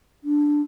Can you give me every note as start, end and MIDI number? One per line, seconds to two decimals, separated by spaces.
0.24 0.61 62